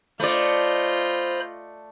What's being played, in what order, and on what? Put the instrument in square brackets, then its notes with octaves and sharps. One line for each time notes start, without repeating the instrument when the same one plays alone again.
[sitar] A3 D5 [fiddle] F4 D#5 [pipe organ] C5 B5